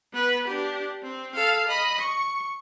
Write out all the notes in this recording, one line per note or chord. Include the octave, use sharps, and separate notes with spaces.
B3 B4
D4 G4
C4
A4 F5
D#5 B5
C#6